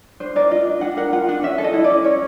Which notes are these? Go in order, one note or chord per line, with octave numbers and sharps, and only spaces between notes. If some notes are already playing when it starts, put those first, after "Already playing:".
D4 C5
A#4 D5
F4 D#5
D4
D4 F#5
A#4 F#5
F4 F#5
D4 F#5
C#4 E5
A4
D#5
E4
D5
C#4
C#4 C#5